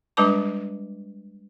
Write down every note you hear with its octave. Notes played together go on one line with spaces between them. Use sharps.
G3 G#3 D4 B4 A5 D6